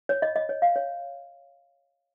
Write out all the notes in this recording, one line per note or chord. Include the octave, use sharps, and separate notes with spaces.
C#5
D#5
D#5
C#5
F5
C#5